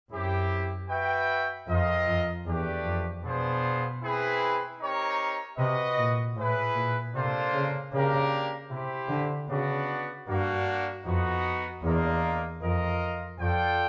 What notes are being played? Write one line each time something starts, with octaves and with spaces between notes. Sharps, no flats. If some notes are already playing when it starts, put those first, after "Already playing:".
F#2 C4 E4 G4
F#4 B4 E5 G5
F2 C4 F4 A#4 D#5
F2
E2 A3 D4 G4 B4 D5
F2
B2 B3 D4 F4 G#4 C5
C4 E4 G#4 B4
C4 D#4 G4 A#4 C#5
C3 F#4 B4 D#5
A#2
A2 E4 G#4 B4
A#2
C3 A#3 D4 F4 A4 C5
C#3
C#3 A#3 D4 G4 A#4
C3 E4 G4 C5
D3
C#3 B3 D4 F#4
G2 A#3 D4 F#4
F2 B3 D#4 F#4
E2 A#3 D4 F4 A#4 D#5
F2 F4 A#4 D#5
F2 F4 A4 D5 G5